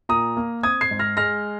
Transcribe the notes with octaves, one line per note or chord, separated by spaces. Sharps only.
A#2 A#5 D#6
A#3
C4 D#6 G#6
G#6 C7
G#2
F6 A#6
G#3 F6 A#6